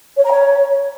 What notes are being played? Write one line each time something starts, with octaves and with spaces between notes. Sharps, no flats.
C#5
A#5
C#5